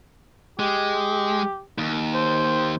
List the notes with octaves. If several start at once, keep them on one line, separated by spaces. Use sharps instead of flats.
G#3 G4
D#2
C5